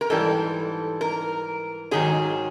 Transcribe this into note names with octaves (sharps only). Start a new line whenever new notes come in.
A#4
G#2 E3 G3 A4
A#4
G#2 D#3 F#3 G#4